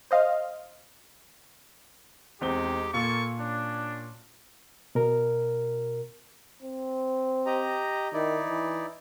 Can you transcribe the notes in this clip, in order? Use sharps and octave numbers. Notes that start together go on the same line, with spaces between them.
C5 D#5 F5
E2 G#3 C4 D#4 G4 G7
A#2 A#3 A4 C#6
C#4 D4
B2 A#4
C4
G4 D#5 A#5
D#3 D#4 E4 D5
E3